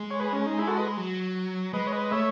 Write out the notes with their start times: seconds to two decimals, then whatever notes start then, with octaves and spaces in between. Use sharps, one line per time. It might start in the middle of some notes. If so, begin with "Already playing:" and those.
Already playing: G#3
0.11 C#5
0.20 G#4 B4
0.33 C#4
0.46 D#4
0.58 E4 G#4
0.67 F#4 A4
0.78 B4 D#5
0.97 F#3
1.73 G#3 B4 D#5
1.87 C#5
1.92 B4 D#5
2.11 A3 C#5 E5